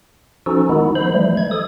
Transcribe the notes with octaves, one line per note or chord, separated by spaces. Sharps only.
F3 C#4 D#4 F#4 A4
D#3 G#3 B3 D#4 E4
F3 C5 B5
E3 F3 G3 A3
G#3 G#6
A4 D#6